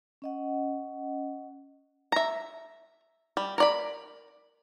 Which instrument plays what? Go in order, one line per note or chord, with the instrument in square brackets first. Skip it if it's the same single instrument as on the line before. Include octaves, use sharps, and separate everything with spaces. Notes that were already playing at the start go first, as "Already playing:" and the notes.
[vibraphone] C#4 D#5 F#5
[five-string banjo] E5 A#5
G3
A#4 D5 B5